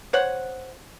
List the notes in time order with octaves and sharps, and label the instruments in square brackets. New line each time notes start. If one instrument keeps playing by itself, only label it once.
[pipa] C5 C#5 F#5